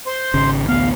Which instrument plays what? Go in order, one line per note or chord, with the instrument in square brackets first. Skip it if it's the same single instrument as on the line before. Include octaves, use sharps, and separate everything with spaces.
[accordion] C5 C6
[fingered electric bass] G#1 C#3
[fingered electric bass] A1 D2 B3 [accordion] F5